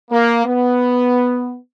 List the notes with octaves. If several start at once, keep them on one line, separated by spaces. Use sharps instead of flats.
A#3
B3